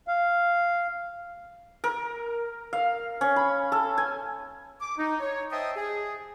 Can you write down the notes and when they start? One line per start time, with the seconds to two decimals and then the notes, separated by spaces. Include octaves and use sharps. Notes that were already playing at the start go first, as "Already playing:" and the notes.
0.08 F5
1.84 A#4
2.73 F5
3.21 C#4
3.36 B5
3.72 A4
3.98 G#5
4.81 D6
4.98 D#4
5.20 C#5
5.51 C5 D#5 E5 G5 A5 D#6
5.76 G#4